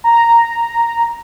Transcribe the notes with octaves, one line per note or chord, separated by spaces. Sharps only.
A#5